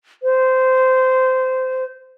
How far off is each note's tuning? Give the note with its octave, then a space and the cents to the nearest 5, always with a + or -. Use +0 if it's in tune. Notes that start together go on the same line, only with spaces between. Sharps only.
C5 -15